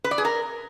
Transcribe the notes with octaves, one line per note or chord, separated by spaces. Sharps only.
B4
D5
G#4
A#4